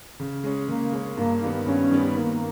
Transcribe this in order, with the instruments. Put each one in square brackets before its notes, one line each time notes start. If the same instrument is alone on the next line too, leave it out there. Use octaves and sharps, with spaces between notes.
[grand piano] C#3
G#3 C#4
[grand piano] C#3 [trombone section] A#3
[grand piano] G#3 C#4
[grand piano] G2 [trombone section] A#3
[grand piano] D#3 G3 B3
[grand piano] G2 [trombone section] C#4
[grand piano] D#3 G3 B3
[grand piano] D#3 [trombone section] A#3